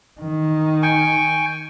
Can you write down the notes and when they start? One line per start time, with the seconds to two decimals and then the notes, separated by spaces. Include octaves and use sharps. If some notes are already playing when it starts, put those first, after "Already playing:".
0.21 D#3
0.83 G5 G#5 C#6